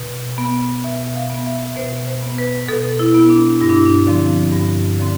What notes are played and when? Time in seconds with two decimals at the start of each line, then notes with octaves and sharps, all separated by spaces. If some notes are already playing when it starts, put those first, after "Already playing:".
Already playing: B2
0.38 B3
0.84 B2 E5
1.16 F5
1.30 B3
1.46 E5
1.76 B2 C5
2.07 C5
2.22 B3
2.38 B4
2.68 B2 A4
2.99 E4
3.14 B3
3.30 D4
3.60 G2 E4
3.70 D4
3.86 D4
4.07 D3 F3 C4
4.52 G2
4.99 D3 F3 C4